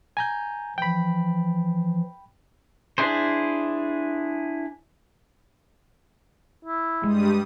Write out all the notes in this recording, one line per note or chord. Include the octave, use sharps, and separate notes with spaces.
G#5 A#5 G6
E3 F3 G5 B5
D4 E4 G#4 C5
E4
G2 G3 G#3 D#6